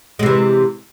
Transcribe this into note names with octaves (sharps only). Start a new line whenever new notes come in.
C3 E3 G#3